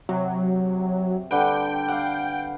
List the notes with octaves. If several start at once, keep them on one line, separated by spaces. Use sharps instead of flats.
C3 F#3
D3 G3 B4 G5
F5 F#5